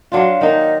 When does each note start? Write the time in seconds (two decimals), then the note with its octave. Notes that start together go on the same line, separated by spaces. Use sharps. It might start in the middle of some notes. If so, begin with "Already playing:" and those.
0.12 F#3 D4 F4 F5
0.41 D#3 A#3 D#4 D#5